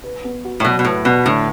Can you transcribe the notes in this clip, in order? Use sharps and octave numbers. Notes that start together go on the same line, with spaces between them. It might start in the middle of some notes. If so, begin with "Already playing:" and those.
B4
B3
F#4
A2
B2 F#3
B2
A2 B4
B2 B3
A2 D3